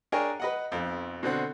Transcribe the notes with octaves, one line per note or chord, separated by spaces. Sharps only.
D4 G#4 A#4 C#5 G5 G#5
B4 D#5 F#5
B1 F2
B2 D3 C4 F#5